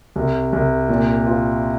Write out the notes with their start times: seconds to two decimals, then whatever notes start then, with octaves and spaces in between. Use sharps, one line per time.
0.16 C2
0.53 C2
0.89 A#2
1.27 F4